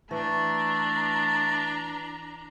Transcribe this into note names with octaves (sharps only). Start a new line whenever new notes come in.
E3 A3 D4 A5 A#5